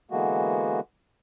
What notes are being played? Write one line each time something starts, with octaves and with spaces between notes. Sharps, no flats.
D3 E3 G#3 A#3 B3 F#4